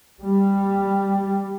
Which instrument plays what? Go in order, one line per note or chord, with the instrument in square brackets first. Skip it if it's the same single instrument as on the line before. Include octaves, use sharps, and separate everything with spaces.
[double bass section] G3